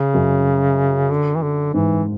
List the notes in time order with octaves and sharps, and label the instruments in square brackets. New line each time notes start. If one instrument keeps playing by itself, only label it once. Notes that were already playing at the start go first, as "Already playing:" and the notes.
Already playing: [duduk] C#3
[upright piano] F#2
[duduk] D3
E3
D3
[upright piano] G#2 [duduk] E3